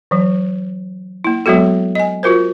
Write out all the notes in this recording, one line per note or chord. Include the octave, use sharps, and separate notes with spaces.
E3 F#3
A#3 E4
F#3 G#3 B3 F#4 A4
D#5 G#5
F4 F#4 A#4 C5